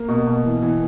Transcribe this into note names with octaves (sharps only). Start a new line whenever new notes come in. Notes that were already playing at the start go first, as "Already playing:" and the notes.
Already playing: A#3
B2
B2
E3
E3